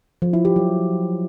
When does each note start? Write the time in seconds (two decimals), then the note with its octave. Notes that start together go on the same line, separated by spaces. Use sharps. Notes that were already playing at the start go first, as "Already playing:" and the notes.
0.22 F3
0.33 E4
0.45 G4
0.56 F#3